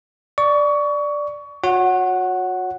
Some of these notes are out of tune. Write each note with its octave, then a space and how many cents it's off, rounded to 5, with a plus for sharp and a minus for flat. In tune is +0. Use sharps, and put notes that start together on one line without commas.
D5 +0 C#6 +25
F#4 -35 C#5 +0 F#5 +0